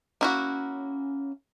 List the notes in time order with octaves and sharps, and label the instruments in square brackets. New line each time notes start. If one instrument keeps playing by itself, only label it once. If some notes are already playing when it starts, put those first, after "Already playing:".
[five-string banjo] A#3 E4 F#4 [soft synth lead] C#4